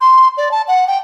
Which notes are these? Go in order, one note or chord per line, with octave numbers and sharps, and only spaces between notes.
C6
D5
A5
F#5
G5